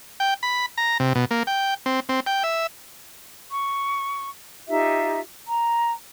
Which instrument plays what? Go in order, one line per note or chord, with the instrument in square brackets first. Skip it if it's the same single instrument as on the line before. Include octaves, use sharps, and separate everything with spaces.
[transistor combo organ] G5
B5
A#5
C3
B2
A#3
G5
C4
C4
G5
E5
[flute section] C#6
D#4 F4 G4 E5
A#5